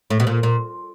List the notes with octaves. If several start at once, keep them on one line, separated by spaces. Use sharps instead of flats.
A2
B2
A#2
A#2